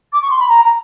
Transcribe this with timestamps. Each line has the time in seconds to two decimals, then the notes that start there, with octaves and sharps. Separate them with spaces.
0.13 D6
0.22 C#6
0.30 C6
0.40 B5
0.49 A#5
0.65 A#5